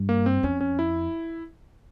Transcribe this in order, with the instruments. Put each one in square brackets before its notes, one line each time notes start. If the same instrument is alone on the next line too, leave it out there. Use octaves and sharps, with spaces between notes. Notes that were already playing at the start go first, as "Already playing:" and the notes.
Already playing: [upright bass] G2
[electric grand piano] A#3
C4
[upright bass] F2 [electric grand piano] C#4
[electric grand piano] C#4
E4